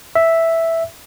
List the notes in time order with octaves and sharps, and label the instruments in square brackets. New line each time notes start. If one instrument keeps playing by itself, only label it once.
[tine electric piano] E5